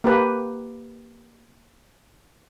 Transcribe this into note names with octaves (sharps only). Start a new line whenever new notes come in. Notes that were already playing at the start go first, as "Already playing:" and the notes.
A#3 G4 B4